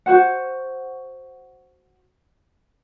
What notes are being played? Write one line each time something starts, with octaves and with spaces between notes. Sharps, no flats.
F#4 C5 F#5